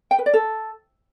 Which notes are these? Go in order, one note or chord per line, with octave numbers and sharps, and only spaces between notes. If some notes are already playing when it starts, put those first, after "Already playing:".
G5
B4
D5
A4